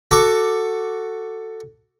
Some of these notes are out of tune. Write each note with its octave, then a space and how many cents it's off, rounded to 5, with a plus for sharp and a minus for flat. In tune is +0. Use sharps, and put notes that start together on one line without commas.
F#4 +0 A4 +10 D6 +0